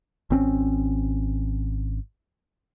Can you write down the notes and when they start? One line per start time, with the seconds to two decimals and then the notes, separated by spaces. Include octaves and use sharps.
0.31 G#1 C4 C#4